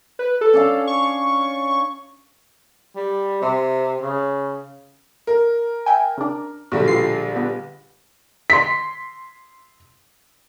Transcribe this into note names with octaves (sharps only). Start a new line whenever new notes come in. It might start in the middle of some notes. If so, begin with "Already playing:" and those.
B4
A4
C#4 D4 F5
C#6
G3
C3
C#3
A#4
E5 G5 G#5
C#3 D4
A#1 D3 G3 F#4
B2 F4 C7
A#2 B3
C6 B6